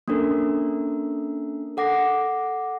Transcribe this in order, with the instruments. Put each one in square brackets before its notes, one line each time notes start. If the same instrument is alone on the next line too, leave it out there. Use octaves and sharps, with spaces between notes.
[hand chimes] A#3 C#4 D4 A4 A#4
A4 F#5 D6 A#6 C7